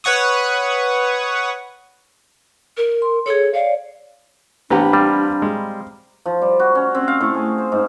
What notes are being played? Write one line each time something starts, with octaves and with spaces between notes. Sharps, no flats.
B4 C#5 F#5 C#6 D#6
A#4
C6
G#4 A4 C#5
C#5 D5 F5
A1 B3 C4 D4 G4 A#5 B5
G3 F5
G#3
F3
G3
F#4
C#4
C4
F5
A2
G#4
C5
G#2